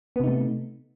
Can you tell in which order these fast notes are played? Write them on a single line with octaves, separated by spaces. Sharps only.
B3 C3 D#4 A3